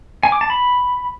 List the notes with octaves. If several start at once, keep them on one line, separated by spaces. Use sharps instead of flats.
G#5
D6
A5
B5